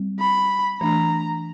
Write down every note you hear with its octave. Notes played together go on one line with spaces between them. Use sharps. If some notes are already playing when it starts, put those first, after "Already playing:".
Already playing: G3 C4
B5
E3 A3 D4 A#5